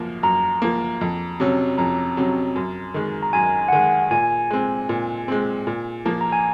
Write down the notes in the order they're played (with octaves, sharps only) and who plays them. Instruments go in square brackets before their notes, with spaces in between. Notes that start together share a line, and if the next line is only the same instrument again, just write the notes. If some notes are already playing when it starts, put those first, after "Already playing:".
Already playing: [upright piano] F#2 F3 A#3
[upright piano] F#2 [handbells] A#5
[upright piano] F3 A#3
F2
C3 F#3 C#4
[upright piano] F2 [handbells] A#5
[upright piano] C3 F#3 C#4
F#2
D#3 G#3
[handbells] A#5
[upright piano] F#2 [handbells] G#5
[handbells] F#5
[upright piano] D#3 G#3 [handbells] G#5
[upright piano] A#2 [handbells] G#5
[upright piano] G#3 C4
A#2
G#3 C4
A#2
F3 A#3
[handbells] A#5
G#5